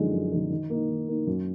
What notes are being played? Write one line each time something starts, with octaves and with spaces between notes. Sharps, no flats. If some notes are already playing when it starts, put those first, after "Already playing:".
Already playing: F#2 D3 F3 G#3 D#4
F#2
D3 F3 G#3 D#4
D#3
A#3 D#4
D#3
A#3 D#4
F#2